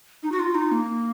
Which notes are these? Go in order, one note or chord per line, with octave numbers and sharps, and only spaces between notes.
D#4
F#4
F4
D#4
A#3